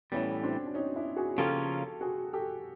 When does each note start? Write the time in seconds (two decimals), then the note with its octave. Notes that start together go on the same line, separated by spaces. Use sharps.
0.12 A2 E3 G3 B3 C#4
0.43 C4 D4
0.67 D4
0.74 C#4 D#4
0.96 D4 E4
1.16 F#4 G#4
1.38 C#3 F3 A#3 C#4 F4 G4 A4
2.01 F#4 G#4
2.33 G4 A4